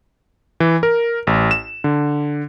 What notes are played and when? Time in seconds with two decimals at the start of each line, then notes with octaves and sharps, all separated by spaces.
0.60 E3
0.83 A#4
1.27 A1
1.51 E7
1.84 D3